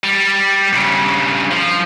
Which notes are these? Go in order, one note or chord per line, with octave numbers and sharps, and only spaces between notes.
G3
G2 C#3
F3